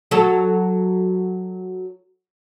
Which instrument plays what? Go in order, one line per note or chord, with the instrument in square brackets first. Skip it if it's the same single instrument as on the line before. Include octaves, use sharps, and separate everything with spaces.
[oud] F#3 A4